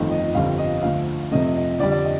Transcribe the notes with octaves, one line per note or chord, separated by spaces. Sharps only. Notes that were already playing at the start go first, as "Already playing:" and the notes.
Already playing: G1 F2 D#3 A3
D#5
G1 F2 D3 G3 F5
D#5
D2 D3 F3 F5
F2 C3 F3 A3 D#5
D#5
F2 D3 G3 D5
D5
D#5